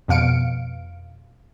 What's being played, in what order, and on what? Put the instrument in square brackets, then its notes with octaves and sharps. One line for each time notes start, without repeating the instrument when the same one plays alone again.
[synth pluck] F2 B2 F5 C#7 D7